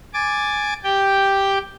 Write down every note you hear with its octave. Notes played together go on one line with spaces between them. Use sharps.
G#5 D6 A6
G4 G5